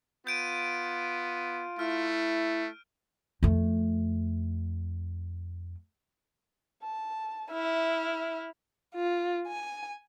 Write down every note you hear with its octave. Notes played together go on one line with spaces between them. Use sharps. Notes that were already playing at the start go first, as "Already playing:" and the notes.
B3 F4 G6 D7 D#7
A3 E4 F6
F2 A3
A5
E4 E5 F6
F4
G#5